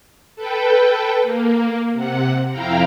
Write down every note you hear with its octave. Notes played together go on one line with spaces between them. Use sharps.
A4 B4 G5
A#3
C3 F#5
F2 E4 F5 G5 A#5